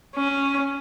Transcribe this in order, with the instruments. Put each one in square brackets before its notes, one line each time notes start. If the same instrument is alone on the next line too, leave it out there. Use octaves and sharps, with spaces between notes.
[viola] C#4